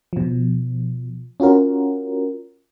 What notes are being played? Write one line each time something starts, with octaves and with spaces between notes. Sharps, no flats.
B2 F3
C#4 F4 F#4 A#4